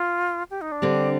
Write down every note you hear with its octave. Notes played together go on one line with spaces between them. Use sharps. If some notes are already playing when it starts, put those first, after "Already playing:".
Already playing: F4
G4
D#4
D4
D3 G3 C4